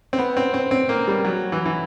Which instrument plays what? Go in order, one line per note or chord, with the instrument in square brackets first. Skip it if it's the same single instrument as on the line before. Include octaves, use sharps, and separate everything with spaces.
[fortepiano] C4
B3
C4
C4
C4
A#3
G3
F#3
E3
E3